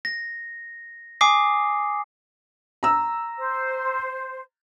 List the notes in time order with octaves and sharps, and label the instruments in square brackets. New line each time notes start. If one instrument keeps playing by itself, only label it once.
[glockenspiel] A#6
G#5 D6 D#6 C7
[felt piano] A#5 E6
[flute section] C5